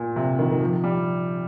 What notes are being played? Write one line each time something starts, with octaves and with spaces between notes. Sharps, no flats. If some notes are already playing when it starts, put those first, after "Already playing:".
Already playing: A#2
C3
D#3
D#3
F3
G3